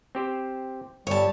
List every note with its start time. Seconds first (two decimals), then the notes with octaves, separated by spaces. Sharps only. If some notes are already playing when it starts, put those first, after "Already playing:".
0.15 C4 G4 C5
1.07 G1 G3 C#5 A5